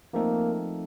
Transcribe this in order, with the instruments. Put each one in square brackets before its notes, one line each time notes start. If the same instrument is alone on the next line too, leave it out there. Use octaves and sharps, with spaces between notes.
[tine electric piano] F3 A3 C4 D#4 A4 [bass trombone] A#3